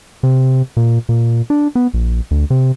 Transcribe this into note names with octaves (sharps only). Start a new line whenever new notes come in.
C3
A#2
A#2
D4
B3
A#1
D2
C3